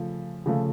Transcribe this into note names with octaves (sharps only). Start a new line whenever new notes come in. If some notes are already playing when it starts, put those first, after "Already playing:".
Already playing: C#3 F3 A3
C#3 F3 A3